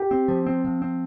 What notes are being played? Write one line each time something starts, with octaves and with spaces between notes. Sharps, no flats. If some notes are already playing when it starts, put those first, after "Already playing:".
Already playing: G4
C4
F3
C4
F3
C4